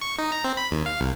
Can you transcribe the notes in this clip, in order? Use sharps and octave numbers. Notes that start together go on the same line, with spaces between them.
C#6
D#4
A#5
C4
B5
D#2
F5
C2